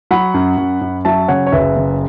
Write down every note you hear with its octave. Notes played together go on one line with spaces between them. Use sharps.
F#3 F#5 B5
F#2
F#2
F#2
F#3 E5 A5
C#3 C#5 F#5
C#5
F#1 B4 E5
C#3